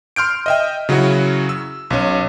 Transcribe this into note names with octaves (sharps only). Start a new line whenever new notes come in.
C6 F6 G6 D7
D#5 E5 G5
C#3 F#3 C#4 E4 F#4
E6
B1 C#4